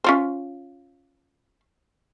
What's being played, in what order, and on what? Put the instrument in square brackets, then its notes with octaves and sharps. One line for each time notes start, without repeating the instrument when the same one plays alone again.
[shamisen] C#4 F4 C5